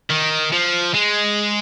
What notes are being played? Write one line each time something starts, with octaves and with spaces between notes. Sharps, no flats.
D#3
F3
G#3